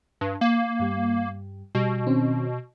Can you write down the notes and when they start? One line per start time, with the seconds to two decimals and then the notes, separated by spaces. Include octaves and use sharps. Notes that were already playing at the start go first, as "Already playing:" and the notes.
0.21 G2
0.41 A#3
0.80 G2 G3
1.75 B2 G3
2.06 D#3 C4 C#4